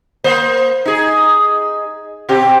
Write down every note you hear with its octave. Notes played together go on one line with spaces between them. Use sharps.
A#3 C5
D#4 G#4
B2 C4 G4